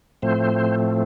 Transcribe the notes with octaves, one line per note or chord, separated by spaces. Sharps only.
A2 F3 A3 C4 C5